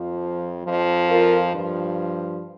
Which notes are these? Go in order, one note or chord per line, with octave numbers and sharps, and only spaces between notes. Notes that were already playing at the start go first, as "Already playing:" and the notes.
Already playing: F2 F3
F2 F3
F4 A#4
G2 F3